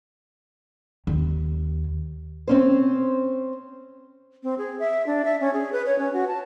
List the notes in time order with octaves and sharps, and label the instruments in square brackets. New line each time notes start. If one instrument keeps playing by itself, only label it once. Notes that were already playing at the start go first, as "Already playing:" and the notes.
[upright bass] D#2
[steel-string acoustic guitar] C4 C#4 C5
[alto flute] C4
G#4
E5
D4
E5
C#4
G#4
B4
C#5
C#4
F#4
A5